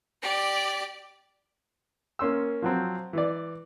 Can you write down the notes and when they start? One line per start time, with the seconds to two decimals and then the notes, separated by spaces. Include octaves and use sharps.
0.20 G4 D5
2.19 A#3 C#4 C6 E6
2.62 F3 F#3 C4
3.13 E3 D5